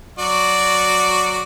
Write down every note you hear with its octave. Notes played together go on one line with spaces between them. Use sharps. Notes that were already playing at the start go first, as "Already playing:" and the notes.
F#3 F#4 D5